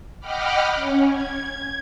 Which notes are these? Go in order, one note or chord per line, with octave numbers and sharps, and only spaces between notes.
D#5 F#5 G5 B5 D6 F6
C#4
G#6